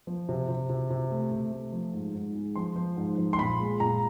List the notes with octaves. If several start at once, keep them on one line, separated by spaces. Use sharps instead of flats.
F3
C3
C3
C3
C3
A3
C3
A3
F3
G#2
G#2
G#3
F3 C6
F3
G#2
F3
C6
A#2 B5
G#3
A#2 A#5